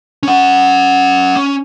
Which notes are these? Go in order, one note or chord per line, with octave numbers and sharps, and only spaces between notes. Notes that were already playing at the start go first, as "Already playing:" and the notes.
C#4 F#5
C#4